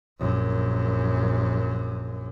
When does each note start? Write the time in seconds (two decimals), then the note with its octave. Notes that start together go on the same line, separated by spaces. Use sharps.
0.19 A#1 F#2